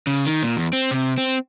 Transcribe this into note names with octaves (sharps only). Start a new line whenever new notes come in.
C#3
D#3
A#2
E2
C4
C3
C4